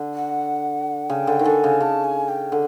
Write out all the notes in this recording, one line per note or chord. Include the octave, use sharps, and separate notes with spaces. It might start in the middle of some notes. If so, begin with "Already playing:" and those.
Already playing: D3
F#5
C#3 G5
D3
D#3
D3 G#5
C#3
C#3 A5
G#5
G5
D3